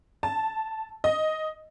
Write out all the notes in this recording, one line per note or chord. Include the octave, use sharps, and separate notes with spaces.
A5
D#5